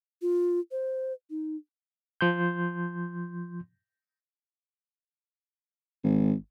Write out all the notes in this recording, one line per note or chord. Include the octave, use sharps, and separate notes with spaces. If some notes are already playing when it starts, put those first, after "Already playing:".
F4
C5
D#4
F3 C6 G6
G#1